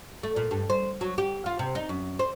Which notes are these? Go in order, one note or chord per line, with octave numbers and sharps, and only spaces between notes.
A3
A#2
G2
C5
F#3
G4
F4
C3
D#4
F#2
C5